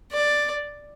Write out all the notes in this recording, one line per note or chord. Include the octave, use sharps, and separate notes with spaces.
D5